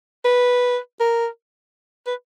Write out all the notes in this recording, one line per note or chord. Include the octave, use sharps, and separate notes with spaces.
B4
A#4
B4